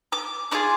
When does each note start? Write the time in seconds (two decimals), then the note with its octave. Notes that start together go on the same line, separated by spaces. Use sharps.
0.12 D6
0.51 D4 F4 G#4 D6